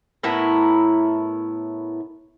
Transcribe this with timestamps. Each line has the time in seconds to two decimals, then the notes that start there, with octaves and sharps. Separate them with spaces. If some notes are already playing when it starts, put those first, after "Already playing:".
0.23 A2 B3 E4 A#4